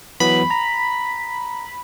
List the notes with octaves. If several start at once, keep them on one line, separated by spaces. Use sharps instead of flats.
E3 F#3 B3 B5
A#5